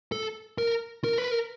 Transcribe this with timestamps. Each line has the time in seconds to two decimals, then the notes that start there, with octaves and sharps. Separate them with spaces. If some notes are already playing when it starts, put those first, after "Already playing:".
0.12 A4
0.58 A#4
1.04 A#4
1.18 B4
1.31 A#4